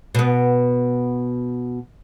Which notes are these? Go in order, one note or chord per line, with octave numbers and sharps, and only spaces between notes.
B2 B3